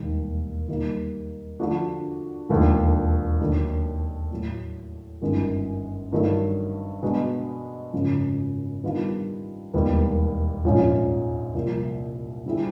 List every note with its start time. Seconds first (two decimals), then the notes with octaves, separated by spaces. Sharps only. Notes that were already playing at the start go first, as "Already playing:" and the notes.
Already playing: E1 D#2 D#3 G3 A#3
0.68 D#3 G3 A#3
1.59 D3 F3 A3 D4 F#4
2.49 E1 D#2 D3 F3 A3
3.40 D#2 D#3 F#3 A3 D4
4.31 A2 F#3 A3
5.22 G1 F#2 D#3 G#3
6.12 G2 D#3 F#3 A3
7.02 B2 G#3 B3 D4 F#4
7.93 G#1 F#2 C#3 F3
8.83 D#3 G3 B3 D4 F4
9.74 E1 D#2 D#3 G3 B3
10.64 A#1 G#2 F3 G#3 C#4
11.55 C2 A#2 F3 A#3
12.46 D3 G3 C4 E4 G#4